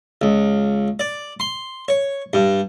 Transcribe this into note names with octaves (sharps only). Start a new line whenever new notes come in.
C#2
D5
C6
C#5
G2